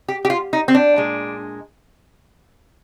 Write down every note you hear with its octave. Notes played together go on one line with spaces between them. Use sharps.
G4
G4
F4
D#4
C4
D4
A#2 G#3